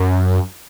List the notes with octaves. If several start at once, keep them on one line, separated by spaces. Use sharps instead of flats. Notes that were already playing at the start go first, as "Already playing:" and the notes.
Already playing: F#2